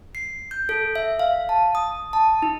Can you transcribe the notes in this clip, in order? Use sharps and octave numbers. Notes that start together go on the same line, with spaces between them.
C7
G6
A4
E5
F5
A5
D#6
A5
D#4